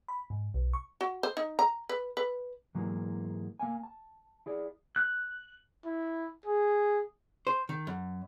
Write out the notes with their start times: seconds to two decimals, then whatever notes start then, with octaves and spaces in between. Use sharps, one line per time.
0.08 B5
0.30 G#2
0.54 B1
0.73 C#6
1.01 F#4
1.23 C5
1.37 D#4
1.59 A#5
1.89 B4
2.17 B4
2.75 G#2 E3 F#3 G#3 A#3 E4
3.59 A#3 F5 G#5
3.83 A5
4.46 E4 G#4 D5
4.96 F#6
5.85 E4
6.45 G#4
7.47 C5
7.69 D#3
7.87 F#2